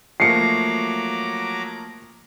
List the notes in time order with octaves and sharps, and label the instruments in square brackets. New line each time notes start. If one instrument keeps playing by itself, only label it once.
[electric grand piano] F3 A3 A#3 [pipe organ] F#3 A#5 D6 [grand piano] C7 C#7